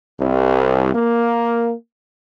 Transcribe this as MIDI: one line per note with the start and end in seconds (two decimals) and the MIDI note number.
0.20 0.92 36
0.94 1.73 58